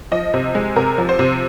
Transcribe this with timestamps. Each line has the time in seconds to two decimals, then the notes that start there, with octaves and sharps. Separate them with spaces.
0.11 F3 D#5
0.34 C3
0.55 G#3
0.76 C3 A#4
0.98 F3
1.09 C5
1.19 C3